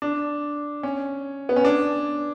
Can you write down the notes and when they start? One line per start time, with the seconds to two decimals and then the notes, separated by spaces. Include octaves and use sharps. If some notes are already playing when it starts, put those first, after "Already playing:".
0.02 D4
0.83 C#4
1.49 B3
1.56 C#4
1.65 D4